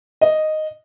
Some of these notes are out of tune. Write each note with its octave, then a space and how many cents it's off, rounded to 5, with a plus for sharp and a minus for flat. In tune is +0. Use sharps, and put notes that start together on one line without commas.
D#5 -5